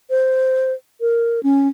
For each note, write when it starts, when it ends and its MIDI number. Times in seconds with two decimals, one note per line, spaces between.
0.10 0.73 72
1.01 1.40 70
1.43 1.68 61